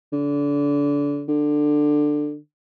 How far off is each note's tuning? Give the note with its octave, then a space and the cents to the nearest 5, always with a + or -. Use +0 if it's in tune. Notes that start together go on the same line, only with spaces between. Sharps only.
D3 -30
D3 +15